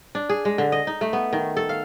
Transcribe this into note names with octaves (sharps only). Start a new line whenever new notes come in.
D4
G#4
G#3
D3
D#5
D#4
A3
B3
D#3
A4
F5